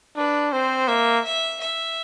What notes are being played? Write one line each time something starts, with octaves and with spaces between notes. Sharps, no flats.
D4 B4
C4 C5
A#3 E5
E5
E5